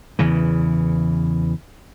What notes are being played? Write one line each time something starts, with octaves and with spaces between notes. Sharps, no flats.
E2 C#3 E3